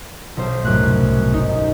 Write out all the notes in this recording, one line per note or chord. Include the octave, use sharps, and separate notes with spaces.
B1 C5
C2 F#2 A2 F#6
G1 D#4